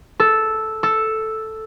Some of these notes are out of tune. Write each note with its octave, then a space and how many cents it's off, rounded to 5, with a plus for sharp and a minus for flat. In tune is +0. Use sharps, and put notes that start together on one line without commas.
A4 -5
A4 +0